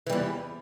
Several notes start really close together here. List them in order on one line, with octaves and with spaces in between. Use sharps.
E3 G3 E2